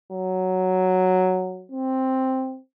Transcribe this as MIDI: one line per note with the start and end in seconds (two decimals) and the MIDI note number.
0.12 1.66 54
1.72 2.59 60